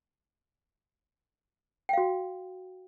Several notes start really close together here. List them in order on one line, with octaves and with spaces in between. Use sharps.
G5 F5 F#4